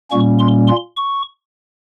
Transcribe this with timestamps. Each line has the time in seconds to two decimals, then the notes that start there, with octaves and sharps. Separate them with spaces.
0.11 A#2 G3 A#3 C#4 C#6
0.39 C6
0.68 C6
0.97 C#6